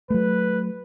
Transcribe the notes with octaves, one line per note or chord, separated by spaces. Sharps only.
F#3 A3 B4